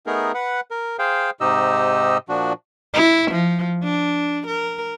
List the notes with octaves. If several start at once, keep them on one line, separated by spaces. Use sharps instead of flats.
A3 B3 D#4 G#4 A#4
B4 F#5
A#4
G#4 C5 F5 G5
G#2 C3 D#4 G4 D#5 E6
A#2 F3 D4 F#4
E4
F3
D4
A#4